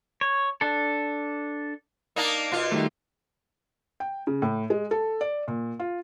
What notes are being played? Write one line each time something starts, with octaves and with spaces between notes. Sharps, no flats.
C#5
D4 A4
A#3 D4 D#4
B2 F4
D#3 G3 A3
G5
C#3
A2
G#3
A4
D5
A#2
F4